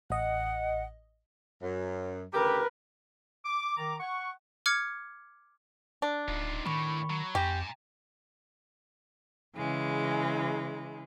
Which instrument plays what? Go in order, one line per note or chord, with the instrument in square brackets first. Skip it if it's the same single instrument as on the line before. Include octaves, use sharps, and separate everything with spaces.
[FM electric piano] A1 D#5 [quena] F#5
[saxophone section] F#2
[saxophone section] D2 C#3 G4 [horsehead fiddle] A#4 B4
[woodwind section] D6
D#3 A#5 D6
F#5 C#6
[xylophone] D6 F6 G#6 C#7
[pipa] D4
[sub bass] D1 [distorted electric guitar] D#3 F4
[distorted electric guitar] A2 [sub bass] D#3 [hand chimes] B5 C#6
[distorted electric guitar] F#3
[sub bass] F2 [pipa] G4 [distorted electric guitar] G#5 A#5
[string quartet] C#3 E3 G#3